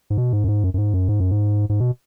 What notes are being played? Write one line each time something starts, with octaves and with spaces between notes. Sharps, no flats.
G#2
B2
G#2
F#2
G#2
F#2
F#2
G#2
F#2
G#2
F#2
G#2
G#2
B2